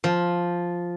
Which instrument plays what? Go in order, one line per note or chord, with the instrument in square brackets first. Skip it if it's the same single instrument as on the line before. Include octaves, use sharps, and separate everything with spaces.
[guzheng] F3